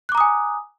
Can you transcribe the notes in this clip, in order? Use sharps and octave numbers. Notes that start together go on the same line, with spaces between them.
G#5 A#5 D6 D#6 F#6